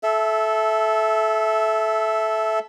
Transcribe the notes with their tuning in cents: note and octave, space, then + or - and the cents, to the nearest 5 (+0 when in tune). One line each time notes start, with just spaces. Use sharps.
A4 -20 E5 +0